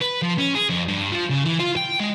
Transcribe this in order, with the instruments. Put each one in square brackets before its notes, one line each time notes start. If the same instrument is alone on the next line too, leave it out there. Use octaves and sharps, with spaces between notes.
[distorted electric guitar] B4
F3
C#4
G#4
F2
G2
F3
C#3
E3
F4
G5
G#3